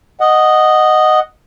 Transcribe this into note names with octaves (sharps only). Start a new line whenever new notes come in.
D#5 F#5